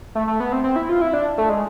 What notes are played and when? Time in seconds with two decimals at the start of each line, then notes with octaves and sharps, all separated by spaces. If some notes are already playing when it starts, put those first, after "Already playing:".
0.15 A3
0.27 A3
0.40 B3
0.52 C4
0.64 C4
0.76 E4
0.89 F4
1.01 E4
1.13 D4
1.38 A3
1.49 G#3